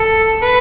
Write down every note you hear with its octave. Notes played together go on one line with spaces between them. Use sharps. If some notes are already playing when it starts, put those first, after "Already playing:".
Already playing: A4
B4